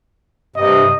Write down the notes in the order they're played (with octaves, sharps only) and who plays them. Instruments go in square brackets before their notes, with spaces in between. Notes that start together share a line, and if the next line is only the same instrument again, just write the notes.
[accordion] G2 C3 [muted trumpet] D#5